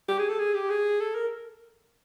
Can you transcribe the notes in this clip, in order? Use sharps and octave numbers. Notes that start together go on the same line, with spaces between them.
G4
G#4
A4
G#4
G4
G#4
A4
A#4